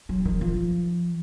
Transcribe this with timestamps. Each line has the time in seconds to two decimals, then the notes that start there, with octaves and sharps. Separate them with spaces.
0.09 F#3
0.25 D#3
0.41 F3